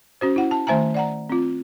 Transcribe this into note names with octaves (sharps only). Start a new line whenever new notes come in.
C#4 F#4 C5
E4 F#5
A5
D#3 A3 C5 E5 G#5 A#5
D5 F#5 A#5
C4 F4